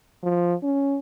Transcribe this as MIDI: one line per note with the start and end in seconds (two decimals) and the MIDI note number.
0.23 0.54 53
0.63 0.99 61